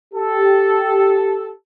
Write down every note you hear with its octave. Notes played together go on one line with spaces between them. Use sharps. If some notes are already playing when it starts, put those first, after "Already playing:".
G4 A4